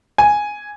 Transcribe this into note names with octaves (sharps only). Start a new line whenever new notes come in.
G#5